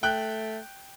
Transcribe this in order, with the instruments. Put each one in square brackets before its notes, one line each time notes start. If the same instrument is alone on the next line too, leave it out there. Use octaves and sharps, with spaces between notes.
[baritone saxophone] A3 [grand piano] G5 F#6